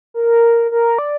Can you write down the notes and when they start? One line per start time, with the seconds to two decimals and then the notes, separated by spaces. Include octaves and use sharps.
0.14 A#4
0.71 A#4
0.98 D5